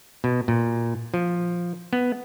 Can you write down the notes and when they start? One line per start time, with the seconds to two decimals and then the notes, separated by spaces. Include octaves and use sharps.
0.24 B2
0.48 A#2
1.14 F3
1.93 B3